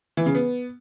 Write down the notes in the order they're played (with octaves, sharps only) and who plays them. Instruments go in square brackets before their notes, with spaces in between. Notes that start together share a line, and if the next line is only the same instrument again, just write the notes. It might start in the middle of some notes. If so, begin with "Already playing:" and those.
[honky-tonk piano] E3
C#3
B3